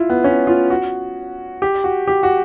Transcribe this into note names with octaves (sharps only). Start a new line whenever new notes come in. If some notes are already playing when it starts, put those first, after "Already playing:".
Already playing: E4 F4
B3
C#4
F4
F#4
G4
F#4
G4
F#4